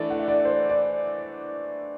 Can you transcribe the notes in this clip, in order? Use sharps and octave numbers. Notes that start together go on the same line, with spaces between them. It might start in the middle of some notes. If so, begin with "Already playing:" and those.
Already playing: E3 A3 D4 A4 D5
F#5
E5
D5
C5
D5